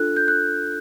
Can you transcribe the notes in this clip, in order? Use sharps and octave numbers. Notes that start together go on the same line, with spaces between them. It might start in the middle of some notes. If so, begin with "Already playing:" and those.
Already playing: D4 F4 A4 F#6
G6
F#6